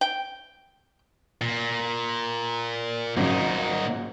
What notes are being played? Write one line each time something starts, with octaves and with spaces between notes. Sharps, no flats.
G5
A#2
G#1 A#2 C#3 F#3 D#4